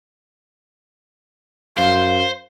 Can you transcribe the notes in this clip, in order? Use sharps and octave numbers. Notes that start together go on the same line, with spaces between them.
F#2 C5 F5